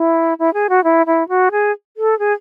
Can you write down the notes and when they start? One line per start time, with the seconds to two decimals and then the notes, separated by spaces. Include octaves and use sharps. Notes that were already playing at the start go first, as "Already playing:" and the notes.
Already playing: E4
0.39 E4
0.54 G#4
0.69 F#4
0.84 E4
1.06 E4
1.29 F#4
1.51 G#4
1.97 A4
2.19 G#4